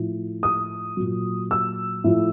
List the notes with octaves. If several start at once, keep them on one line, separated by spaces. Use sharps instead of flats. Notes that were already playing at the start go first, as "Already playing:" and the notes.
Already playing: A2 F3
D#6
A#2 F#3
E6
A2 F3